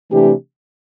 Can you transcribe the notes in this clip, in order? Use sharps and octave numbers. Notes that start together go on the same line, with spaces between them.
C3 E3 A3 D4 G4